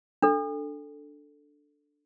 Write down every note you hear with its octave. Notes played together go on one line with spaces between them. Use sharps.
D4 A4